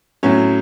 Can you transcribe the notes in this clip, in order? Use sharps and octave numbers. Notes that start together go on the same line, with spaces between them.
A2 F#3 C#4